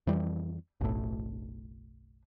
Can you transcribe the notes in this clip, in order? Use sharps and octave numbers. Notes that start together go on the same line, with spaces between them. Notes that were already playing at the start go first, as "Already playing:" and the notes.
F2 E3 G3
F#1 B1 A2